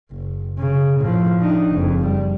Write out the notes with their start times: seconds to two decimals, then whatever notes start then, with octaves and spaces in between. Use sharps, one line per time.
0.11 F#1
0.58 C#3
1.00 A2 F3
1.40 D4 D#4
1.71 F#1 F2
2.05 G3